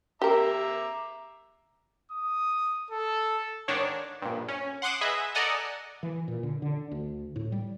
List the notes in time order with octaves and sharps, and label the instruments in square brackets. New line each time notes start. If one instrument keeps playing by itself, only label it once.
[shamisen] G4 A#4 [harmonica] E5 A#5 D6
[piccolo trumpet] D#6
A4
[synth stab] G#2 D#3 D4 C#5
A#1 G2
C#4
F#5 C6 D6 D#6 E7
G#4 B4 D#5 E5
A4 D5 D#5 F#5 G#5 A#5
[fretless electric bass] E3
A#2
D3
D3
D2
A2
G3